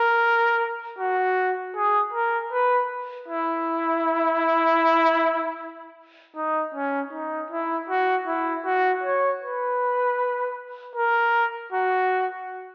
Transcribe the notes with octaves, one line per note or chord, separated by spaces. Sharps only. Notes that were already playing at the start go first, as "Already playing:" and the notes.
Already playing: A#4
F#4
G#4
A#4
B4
E4
D#4
C#4
D#4
E4
F#4
E4
F#4
C#5
B4
A#4
F#4